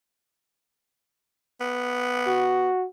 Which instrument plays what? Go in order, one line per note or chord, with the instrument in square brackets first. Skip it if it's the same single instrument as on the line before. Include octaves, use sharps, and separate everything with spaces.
[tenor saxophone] B3
[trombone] F#4